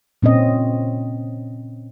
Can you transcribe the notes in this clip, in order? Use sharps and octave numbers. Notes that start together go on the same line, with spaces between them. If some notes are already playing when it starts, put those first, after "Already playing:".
A#2 C4 C#4 D#5